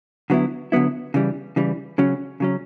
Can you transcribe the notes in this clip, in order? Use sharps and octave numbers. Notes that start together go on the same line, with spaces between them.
D3 F#3 B3 E4
D3 F#3 B3 E4
C#3 E3 G3
C#3 E3 G3
C#3 F#3 C#4
C#3 F#3 C#4